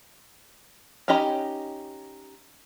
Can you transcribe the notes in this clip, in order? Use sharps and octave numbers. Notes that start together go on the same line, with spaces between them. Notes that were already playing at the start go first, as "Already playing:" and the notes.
C#4 D#4 G4 D#5 B5